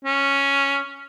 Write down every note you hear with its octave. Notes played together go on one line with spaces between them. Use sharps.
C#4